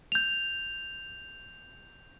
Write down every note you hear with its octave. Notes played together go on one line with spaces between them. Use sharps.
G6 F7